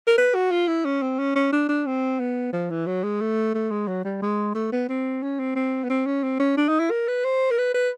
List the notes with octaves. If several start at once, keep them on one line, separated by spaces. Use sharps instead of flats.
A#4
B4
F#4
F4
E4
C#4
C4
C#4
C#4
D4
D4
C4
B3
F3
E3
F#3
G#3
A3
A3
G#3
F#3
G3
G#3
A3
B3
C4
C#4
C4
C4
B3
C4
C#4
C4
C#4
D4
D#4
E4
A#4
B4
C5
A#4
B4
B4